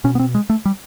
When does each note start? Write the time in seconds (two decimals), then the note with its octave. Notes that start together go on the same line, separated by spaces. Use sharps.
0.04 B2 C#4
0.15 B3
0.19 C4
0.35 G#3
0.50 A3
0.65 G3